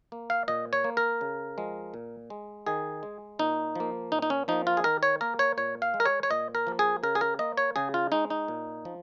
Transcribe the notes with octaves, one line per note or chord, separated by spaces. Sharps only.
A#3
F5
A#2 D#5
C#5
A#3
A#4
C#3
F3 G#3
A#2
G#3
D#3 G#4
G#3
A#2 D#4
F3 A#3
A#2 D#4
D#4
C#4
F3 A#3 D#4
F4
G#4
D#3 A#4
C#5
A#3 A#4
C#5
A#2 C#5
F5
G#3
A#4
C#5
C#5
A#2 D#5
A#4
F3 A#3
G#4
C#3 A#4
G#4
A#4
A#3 D#5
C#5
C#3 G#4
F4
G#3 D#4
D#4
A#2
F3